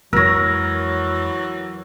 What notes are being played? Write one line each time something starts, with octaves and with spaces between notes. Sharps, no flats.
F2 E3 F#3 G#3 A#4 C#5 E6 A#6